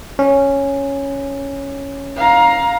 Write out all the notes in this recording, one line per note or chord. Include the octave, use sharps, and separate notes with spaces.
C#4
F5 A#5